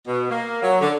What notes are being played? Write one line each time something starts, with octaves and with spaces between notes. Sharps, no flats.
B2
A#3
F#3
D3